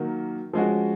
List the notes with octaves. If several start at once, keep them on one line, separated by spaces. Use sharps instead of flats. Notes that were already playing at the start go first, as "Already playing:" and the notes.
Already playing: D#3 F#3 A#3
F3 G#3 C#4 F#4